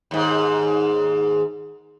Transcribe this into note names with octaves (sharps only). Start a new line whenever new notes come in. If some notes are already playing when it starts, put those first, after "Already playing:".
D#2 G#2